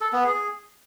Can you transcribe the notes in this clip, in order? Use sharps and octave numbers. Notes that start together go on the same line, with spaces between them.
A4
B3
G#4